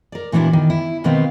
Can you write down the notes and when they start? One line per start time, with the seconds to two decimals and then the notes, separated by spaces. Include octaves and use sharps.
0.12 A#4 D5
0.32 A#2 E3 B3 D4 E4 F#4
0.53 D#3
0.70 E4
1.04 B2 D#3 B3 C4 F5